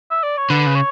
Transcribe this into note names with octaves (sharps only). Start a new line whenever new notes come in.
E5
D5
C#5
D3 B4
C#3
C#5